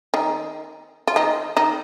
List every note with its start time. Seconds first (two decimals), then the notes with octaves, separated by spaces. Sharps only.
0.14 D#3 D#4
1.07 F4
1.16 D#3 D#4
1.57 D#3 D#4